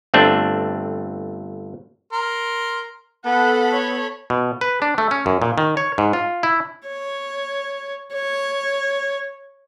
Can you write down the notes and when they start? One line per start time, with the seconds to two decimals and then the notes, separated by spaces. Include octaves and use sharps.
0.14 G1 A3 C4 D4
2.13 A#4 C6
3.25 B3 A4 F#5 B5
3.73 C#5
4.30 B2
4.61 B4
4.82 D4
4.98 A3
5.11 C#4
5.26 F#2
5.42 A#2
5.58 D#3
5.77 C#5
5.98 G#2
6.13 F4
6.43 E4
6.87 C#5
8.14 C#5